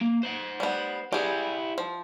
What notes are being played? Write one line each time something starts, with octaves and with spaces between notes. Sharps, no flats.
A#3
C5 F#5
G3 B3
G3 E4 G4 G#4
F3